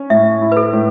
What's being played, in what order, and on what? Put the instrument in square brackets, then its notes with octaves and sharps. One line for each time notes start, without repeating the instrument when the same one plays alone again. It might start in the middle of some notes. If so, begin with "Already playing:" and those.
Already playing: [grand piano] C#4
[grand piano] A2 [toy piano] E5
[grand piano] E4
[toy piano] B4
A4
[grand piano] A2